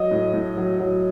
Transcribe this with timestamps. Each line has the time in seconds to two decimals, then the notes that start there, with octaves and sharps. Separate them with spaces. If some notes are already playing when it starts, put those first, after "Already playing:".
Already playing: F#3 D#5
0.11 A2
0.34 A2
0.58 F#3
0.80 F#3